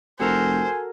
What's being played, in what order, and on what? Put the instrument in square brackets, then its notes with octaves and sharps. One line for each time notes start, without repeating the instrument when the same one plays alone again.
[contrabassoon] F1 [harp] F#4 A4 A#4 [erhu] C5 [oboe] G#5